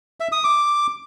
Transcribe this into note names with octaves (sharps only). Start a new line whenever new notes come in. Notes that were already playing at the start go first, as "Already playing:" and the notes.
E5
D#6
D6